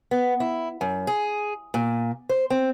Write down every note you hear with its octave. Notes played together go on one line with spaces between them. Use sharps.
B3
E4
F#2
G#4
A#2
C5
C4